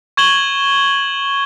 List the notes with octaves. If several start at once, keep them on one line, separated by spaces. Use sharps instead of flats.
C#6 G#6 E7 F#7 G7